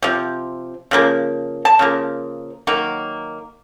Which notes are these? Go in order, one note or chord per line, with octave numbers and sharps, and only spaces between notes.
C3 F3
C#3 F3 A#3
A5
C#3 F3 A#3
D#3 F#3 A#3